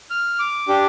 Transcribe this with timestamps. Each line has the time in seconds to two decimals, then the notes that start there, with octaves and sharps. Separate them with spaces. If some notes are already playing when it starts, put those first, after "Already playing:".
0.10 F6
0.39 D6
0.68 D4 G4